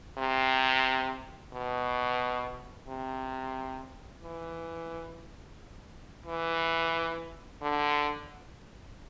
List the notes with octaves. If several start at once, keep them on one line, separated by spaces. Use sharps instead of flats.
C3
B2
C3
E3
E3
D3